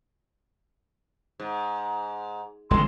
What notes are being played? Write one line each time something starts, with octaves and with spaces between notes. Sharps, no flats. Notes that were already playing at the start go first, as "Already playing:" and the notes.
G#2
G1 C#2 E3 G#3 A4 C6